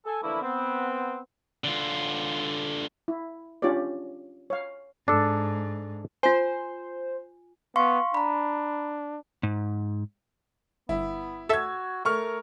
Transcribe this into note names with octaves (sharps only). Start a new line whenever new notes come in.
A4 G#5
D3 E3 F3 A3 A#3 E4
B3 C4
D3 F4
E4
C#4 D4 F4 G4 C#5 D5
C#5 F5
G#2 D4 A4
F4 C5 G#5
B3 F5 C6 C#6
D4 A#5 B5
G#2
G1 B3 E4
F#4 A4 E5 E6 G#6
A3 A#4 C#6 F6